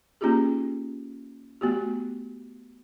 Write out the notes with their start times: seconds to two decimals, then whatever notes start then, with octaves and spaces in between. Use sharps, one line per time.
0.21 A#3 C#4 D#4 F4 G4 G#4
1.61 A3 B3 F#4 G4